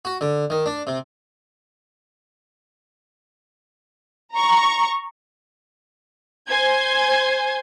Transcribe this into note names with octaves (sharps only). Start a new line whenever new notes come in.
F#4
D3
D#3
D4
C3
A#5 C#6
C5 G#5 G#6